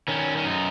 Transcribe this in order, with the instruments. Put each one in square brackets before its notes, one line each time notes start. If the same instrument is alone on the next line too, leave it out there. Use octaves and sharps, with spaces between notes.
[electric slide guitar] D#3 C#4
C#4
F#2 D#4